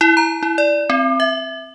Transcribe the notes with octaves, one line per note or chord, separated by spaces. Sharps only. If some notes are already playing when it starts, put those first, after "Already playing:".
E4
A#5
E4
D5
C4
E5